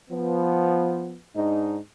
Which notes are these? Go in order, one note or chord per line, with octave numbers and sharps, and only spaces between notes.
F3 B3
G#2 D4 D#4